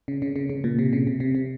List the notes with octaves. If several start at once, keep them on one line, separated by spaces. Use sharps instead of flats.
C#3
C#3
C#3
C#3
A#2
C3
C#3
C3
C3
C3